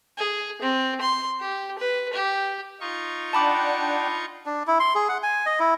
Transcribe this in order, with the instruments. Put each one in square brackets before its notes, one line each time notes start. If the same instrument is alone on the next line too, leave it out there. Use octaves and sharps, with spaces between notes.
[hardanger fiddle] G#4
C4
C6
G4
B4
G4
[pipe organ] D#4 F4 C#6
[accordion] D4 F#5 G5 [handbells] A5 B5 D6
[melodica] D4
E4
C6
G#4
F#5
G#5
D#5
E4